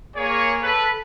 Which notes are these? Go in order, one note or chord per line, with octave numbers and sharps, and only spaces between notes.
A#3 G#4 C#5
A4 B4